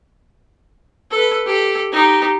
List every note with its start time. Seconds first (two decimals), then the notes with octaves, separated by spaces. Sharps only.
1.11 A4 B4
1.46 G4 A4
1.92 D#4 G4